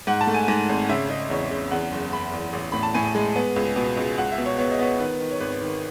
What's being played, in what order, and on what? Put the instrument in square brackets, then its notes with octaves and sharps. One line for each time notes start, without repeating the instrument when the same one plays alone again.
[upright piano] G#2 F#5
A5
A3
G#5
G#2 G#5
G#1
C#3 E5
C#3 D#5
E2 C#5
C#3
E2 F#5
F#1
F#1 B5
E2
A1
A2 B5
A5
A2 G#5
G#3
B3
C#2
B2
C#2
C#2 F#5
E5
B2
C#5
B3 C#5
D#5
B3 C#5
D#3 B4
D#3
C#5
G#1 B4
D#3